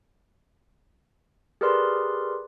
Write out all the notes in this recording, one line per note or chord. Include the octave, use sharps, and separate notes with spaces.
G4 G#4 A#4 B4 D5 C6